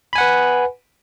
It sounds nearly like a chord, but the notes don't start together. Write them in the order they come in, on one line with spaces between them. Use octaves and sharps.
B5 G#5 F#5 B4